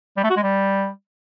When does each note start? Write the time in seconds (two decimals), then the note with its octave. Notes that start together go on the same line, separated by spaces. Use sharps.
0.17 G3
0.23 A3
0.30 F#4
0.36 G#3
0.43 G3